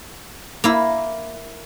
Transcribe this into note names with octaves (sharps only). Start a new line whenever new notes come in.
A#3 E4